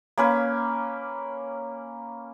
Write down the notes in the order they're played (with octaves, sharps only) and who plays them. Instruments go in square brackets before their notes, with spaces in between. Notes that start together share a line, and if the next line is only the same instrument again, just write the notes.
[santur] A#3 C#4 B4